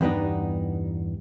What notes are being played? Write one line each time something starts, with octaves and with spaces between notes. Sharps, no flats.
E2 G2 B3 D4 D#4